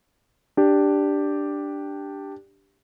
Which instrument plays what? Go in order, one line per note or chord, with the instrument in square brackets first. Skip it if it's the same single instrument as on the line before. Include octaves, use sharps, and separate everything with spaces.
[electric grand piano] D4 G4